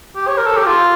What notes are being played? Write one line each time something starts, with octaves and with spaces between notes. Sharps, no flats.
G4
C#5
A#4
A4
G4
F4